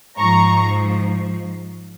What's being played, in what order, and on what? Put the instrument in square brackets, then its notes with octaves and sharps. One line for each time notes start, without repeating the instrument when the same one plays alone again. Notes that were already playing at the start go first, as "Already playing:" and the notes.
[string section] G#2 F3 A#5 C#6